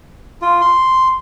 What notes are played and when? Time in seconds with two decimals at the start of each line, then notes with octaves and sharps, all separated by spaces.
0.42 F4
0.61 C6